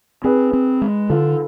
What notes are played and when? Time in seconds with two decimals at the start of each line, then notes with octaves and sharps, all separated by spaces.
0.24 C4 G#4 B4
0.53 C4
0.82 G#3
1.09 D3 F4 A4